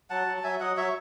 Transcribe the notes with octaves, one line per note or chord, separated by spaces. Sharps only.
F#3 F#5 A5
F#3
A5
F#3 E5 G#5
F#3 D#5 F#5
F#3 C#5 E5